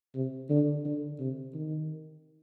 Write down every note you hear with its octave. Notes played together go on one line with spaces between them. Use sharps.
C3
D3
D3
C3
D#3